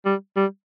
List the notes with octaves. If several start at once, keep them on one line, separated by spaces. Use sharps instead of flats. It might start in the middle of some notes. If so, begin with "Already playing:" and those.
G3
G3